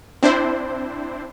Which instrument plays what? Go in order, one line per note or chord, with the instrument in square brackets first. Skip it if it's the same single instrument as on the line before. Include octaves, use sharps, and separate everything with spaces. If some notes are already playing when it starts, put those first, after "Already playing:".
[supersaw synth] C4 D4 E4 C5